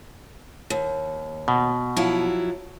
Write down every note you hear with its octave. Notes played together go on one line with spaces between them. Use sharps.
D#2
B2
F3 F#3 E4